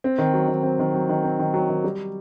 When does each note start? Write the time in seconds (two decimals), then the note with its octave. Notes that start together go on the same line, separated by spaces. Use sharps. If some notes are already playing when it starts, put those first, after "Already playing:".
0.04 C4
0.18 D#3
0.34 F#3
0.48 D#3
0.63 C4
0.79 D#3
0.94 F#3
1.09 D#3
1.24 C4
1.39 D#3
1.54 F#3
1.69 D#3
1.84 G3